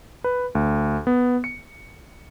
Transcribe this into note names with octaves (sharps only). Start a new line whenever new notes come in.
B4
D2
B3
C#7